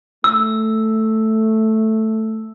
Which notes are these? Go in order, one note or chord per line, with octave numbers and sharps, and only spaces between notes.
A3 E6